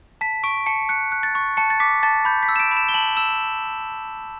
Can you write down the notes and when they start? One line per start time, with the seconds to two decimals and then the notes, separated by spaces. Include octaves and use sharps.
0.21 A5 B6
0.44 C#6 D7
0.66 A5 C#7
0.89 F#6 C#7
1.12 F#6
1.23 A6
1.35 C#6
1.57 A5 C#7
1.70 A6
1.80 D6 B6
2.03 A5 A6
2.25 B5 G6
2.43 B6
2.49 E6
2.56 E7
2.60 D7
2.71 B5
2.77 E7
2.89 G7
2.94 A5 F#7
3.17 E6 E7